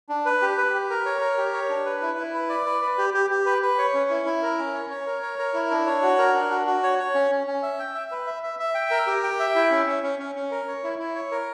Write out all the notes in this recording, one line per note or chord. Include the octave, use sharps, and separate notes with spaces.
D4
B4
G4
B4
G4
A#4
C#5
A#4
G4
C#5
D4
B4
E4
E4
B4
D5
B4
B4
G4
G4
G4
B4
B4
C#5
C#4
E4
E4
A#4
C#4
C#5
C#5
A#4
C#5
A#4
E4
D4
C#5
F#4
A#4
D4
F#4
F#4
C#5
C#5
C#4
C#4
C#4
E5
G5
E5
B4
E5
E5
E5
G5
A#4
G4
G5
E5
E4
C#4
C#4
C#4
C#4
C#4
A#4
C#5
E4
E4
C#5
A#4